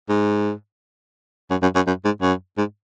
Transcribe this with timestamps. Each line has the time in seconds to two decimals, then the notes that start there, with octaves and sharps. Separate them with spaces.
0.09 G#2
1.51 F#2
1.63 F#2
1.75 F#2
1.87 F#2
2.05 G#2
2.22 F#2
2.58 G#2